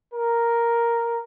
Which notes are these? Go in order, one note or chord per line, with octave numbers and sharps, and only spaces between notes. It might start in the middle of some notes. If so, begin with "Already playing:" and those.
A#4